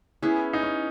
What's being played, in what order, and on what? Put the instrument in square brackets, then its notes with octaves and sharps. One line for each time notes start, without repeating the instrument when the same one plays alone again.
[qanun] B3 E4 G#4 B4 [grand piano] C#4
[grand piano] D#4
C#4